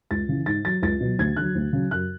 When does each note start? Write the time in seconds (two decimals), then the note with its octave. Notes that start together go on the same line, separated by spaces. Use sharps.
0.11 C#2 A6
0.29 C#3 E3
0.46 G#2 A6
0.65 F#3 A6
0.82 C#2 A6
1.00 B2 F#3
1.19 D2 G#6
1.36 D3 F#3 F#6
1.55 D2
1.73 C#3 F#3
1.91 F#2 F#6